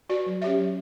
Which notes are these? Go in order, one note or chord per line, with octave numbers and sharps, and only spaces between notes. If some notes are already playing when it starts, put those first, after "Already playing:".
F#4 B4 D5
F#3
C#4 G4 C#5 E5
F#3